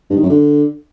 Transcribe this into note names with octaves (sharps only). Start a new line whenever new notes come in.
G2
D#3
F#2
D3